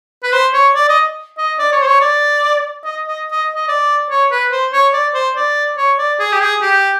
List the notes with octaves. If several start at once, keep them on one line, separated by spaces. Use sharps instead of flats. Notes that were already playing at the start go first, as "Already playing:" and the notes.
B4
C5
C#5
D5
D#5
D#5
D5
C#5
C5
C#5
D5
D#5
D#5
D#5
D#5
D5
C#5
B4
C5
C#5
D5
C5
D5
C#5
D5
G#4
G4
G#4
G4